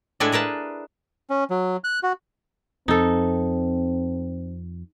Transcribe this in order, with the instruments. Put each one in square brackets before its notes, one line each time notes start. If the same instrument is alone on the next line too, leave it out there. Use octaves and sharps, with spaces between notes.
[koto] A2 G#3 D4 E4 A4 G#5
G#4 A#4 B4 A5
[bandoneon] C#4
F#3
F#6
F#4
[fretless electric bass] F2 [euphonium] C4 [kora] D#4 A4